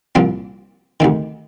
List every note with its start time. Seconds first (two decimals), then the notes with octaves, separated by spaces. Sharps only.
0.15 C2 A#2 F3 C4
1.00 D2 C3 D#3